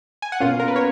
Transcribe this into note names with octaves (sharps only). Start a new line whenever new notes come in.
G#5
F#5
B2 A#3 C#4 F4 F5
A#4
B4
C#5